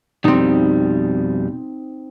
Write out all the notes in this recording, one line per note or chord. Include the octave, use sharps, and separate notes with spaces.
F2 B2 G3 C4 D#4